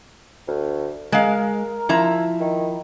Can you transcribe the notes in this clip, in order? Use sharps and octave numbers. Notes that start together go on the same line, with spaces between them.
D2
G#3 A#4 F5
F3 E4 A#5
D#3